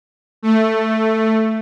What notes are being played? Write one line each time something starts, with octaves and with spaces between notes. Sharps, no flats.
A3